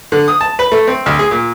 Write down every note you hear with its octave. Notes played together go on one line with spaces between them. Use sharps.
D3
D#6
A5
B4
A3
C4
D2
G#4
A#2